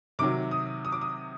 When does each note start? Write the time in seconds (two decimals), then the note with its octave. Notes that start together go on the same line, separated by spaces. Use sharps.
0.19 C3 D#3 F#3 D6
0.51 D#6
0.85 D#6
0.92 D6
1.01 D#6